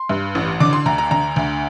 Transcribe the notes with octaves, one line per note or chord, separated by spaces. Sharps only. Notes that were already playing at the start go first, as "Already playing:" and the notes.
Already playing: C6
G2
A1
D3 D6
C6
D2 A#5
A#5
D3 A#5
D2